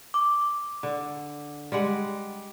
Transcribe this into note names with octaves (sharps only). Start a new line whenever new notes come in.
D6
D3
G3 G#3 F#5